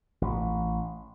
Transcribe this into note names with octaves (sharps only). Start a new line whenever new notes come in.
A1